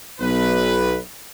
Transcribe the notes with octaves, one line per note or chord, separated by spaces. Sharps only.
B1 B4